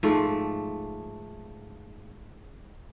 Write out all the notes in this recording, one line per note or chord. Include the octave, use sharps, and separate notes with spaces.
G#2 F3 A3